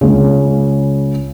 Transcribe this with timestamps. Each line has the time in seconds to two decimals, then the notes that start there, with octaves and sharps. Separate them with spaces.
0.01 C#2 C#3